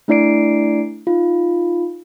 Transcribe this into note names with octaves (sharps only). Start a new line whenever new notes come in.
A3 D4 E4 D5 C7 D7
D#4 F4